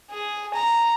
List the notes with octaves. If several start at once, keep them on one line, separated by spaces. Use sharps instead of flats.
G#4
A#5